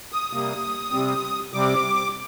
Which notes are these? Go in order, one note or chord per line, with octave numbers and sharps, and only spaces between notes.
D#6
C3 G3 A#3
C3 G3 C4
C3 G3 C4 D6